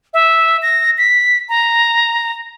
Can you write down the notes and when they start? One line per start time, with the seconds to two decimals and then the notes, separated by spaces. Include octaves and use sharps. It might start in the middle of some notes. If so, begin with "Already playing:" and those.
0.14 E5
0.62 A#6
0.98 B6
1.49 A#5